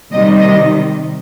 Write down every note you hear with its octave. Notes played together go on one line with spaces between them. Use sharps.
C3 D#3 G3 D#5
D#5